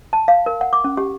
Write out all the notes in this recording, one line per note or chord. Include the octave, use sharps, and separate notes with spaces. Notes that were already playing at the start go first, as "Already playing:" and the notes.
A5
F5
A#4
F#5
D6
C#4
G4